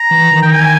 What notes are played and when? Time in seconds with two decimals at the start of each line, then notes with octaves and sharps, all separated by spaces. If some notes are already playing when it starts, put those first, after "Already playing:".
Already playing: A#5
0.11 E3
0.32 D#3
0.43 G5
0.52 G#5